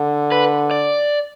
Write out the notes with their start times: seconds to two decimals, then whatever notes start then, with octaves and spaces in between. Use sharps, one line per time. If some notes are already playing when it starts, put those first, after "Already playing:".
Already playing: D3
0.32 B4
0.71 D5